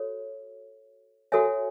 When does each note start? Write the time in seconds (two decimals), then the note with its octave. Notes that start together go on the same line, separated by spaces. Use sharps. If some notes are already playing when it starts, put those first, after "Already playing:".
Already playing: F#4 A4 C#5
1.32 F#4 A4 C#5 E5 G#5